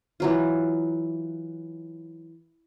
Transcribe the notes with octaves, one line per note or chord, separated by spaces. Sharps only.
E3 F#3 F4